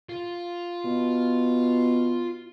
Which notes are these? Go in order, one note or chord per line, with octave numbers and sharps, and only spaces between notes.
F4
B2